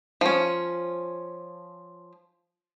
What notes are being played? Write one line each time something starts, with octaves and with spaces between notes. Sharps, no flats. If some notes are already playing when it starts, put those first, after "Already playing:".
F3 C#4